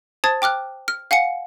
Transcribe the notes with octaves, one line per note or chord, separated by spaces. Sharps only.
C5 A5 D#6 G#6 A6
G5 D6 F6 F#6
F6
F5 F#5 G#5 C#7